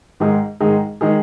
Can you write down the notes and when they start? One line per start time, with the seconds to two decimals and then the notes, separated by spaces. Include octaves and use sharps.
0.20 G#2 D#3 G#3 D#4 G#4
0.60 G#2 D#3 G#3 D#4 G#4
1.01 D#3 G#3 D#4 G#4